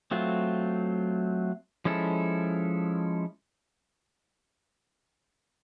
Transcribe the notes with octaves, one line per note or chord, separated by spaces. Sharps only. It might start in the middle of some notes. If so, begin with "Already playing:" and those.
F#3 A3 C4 F4
F3 G#3 C#4 E4 A4